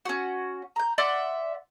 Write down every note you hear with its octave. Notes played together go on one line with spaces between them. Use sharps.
C#4 F#4
A#5 G6
D5 E5 F#5 C6